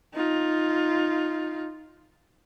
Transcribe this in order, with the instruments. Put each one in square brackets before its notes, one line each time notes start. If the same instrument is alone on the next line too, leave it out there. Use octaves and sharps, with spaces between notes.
[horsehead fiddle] D#4 F4